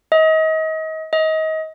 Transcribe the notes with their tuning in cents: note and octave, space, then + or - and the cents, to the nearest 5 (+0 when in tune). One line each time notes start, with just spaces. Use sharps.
D#5 +35
D#5 +30